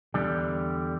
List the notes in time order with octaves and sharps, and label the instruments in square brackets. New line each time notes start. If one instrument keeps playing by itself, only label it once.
[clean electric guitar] E2 D3 G3